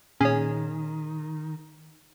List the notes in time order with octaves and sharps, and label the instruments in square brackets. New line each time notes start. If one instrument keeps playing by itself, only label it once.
[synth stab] A#2 [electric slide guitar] D#3 [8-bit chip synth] C#4 C#5 [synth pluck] G#4